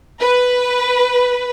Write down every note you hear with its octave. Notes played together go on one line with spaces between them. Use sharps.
B4